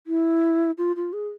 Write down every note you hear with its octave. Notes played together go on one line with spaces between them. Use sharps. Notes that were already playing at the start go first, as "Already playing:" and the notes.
E4
F4
F4
G#4